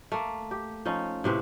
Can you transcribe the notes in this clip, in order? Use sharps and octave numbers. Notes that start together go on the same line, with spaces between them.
A3 A#3
G4
F3 C#4 D#4
A2 C3 C4 B4